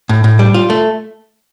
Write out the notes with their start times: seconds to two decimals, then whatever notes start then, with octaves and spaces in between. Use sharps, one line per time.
0.09 A2
0.24 A2
0.39 G3
0.54 F4
0.70 A3